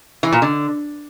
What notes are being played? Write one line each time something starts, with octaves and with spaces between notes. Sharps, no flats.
E3
A#2
D3